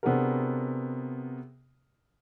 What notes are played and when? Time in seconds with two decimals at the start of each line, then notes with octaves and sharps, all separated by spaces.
0.03 C3 B3 D4 F#4 G#4 A#4